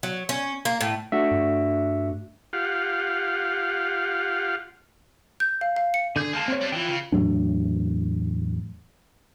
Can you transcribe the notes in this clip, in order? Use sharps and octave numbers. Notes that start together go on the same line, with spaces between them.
F#3
C#4
A#3
A2
A3 D4 F#4 E5
G2
F4 G4 F5 F#5
G6
F5
F5
C#7
D3 G#4 G6
G#3 A#3 G#5 A5
C4 C#5
G3 D4
E3 F4 G5
C#3
E2 A2 F#3 D4